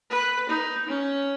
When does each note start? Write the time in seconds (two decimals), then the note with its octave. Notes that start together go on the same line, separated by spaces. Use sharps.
0.10 B4
0.49 D#4
0.89 C#4